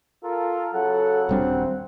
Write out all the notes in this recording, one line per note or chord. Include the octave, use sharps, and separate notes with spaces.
F4 A4 A#4
C#3 F#3 A4 F#5
D#1 G3 C4 D4